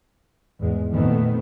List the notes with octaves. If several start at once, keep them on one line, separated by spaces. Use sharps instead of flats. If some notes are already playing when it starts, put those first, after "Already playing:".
E2 G#2 G#3
F2 A#2 D#3 A3 B3 C4